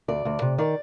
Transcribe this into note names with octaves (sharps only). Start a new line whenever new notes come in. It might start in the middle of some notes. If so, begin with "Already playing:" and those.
D2 D5
D2
C3
D#3 D5